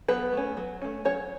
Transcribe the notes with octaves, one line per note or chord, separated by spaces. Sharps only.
F#3 B3 B4
A3 C#4
F#3
A3 C#4
F#3 C#4 C#5